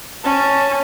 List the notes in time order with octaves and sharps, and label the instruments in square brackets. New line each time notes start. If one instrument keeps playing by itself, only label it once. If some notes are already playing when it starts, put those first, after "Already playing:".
[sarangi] C#4 [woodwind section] A5